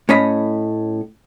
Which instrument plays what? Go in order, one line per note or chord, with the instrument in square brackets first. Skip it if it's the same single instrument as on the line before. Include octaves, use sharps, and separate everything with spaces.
[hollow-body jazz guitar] A2 C#4 C#5 D#5 B5